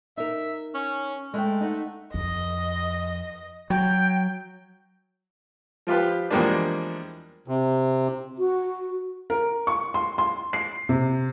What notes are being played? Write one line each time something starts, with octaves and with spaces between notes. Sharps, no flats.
D#4 A#4 E5
C#4
G#3 A3 G5
D#4 F#5
F2 D#5
F#3 G5
F3 F4 G4 B4
E2 F3 G3 G#3 A#3 D4
C3
F#4
A#4
C#6
C6
C6
C7
C3